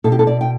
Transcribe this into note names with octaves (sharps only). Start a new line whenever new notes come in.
B2 A4
G4
A4
D5
G5